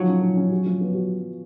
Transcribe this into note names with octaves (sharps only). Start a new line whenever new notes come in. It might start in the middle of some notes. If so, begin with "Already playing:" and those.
Already playing: D#3 F3 F#3
C#4
F3
C#4
F#4
F3
B3
F#4